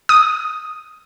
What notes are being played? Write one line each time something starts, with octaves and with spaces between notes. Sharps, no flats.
D#6